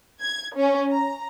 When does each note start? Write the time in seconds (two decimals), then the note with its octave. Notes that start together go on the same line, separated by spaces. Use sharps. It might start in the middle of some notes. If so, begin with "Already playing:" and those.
0.21 G#6
0.56 C#4
0.90 A#5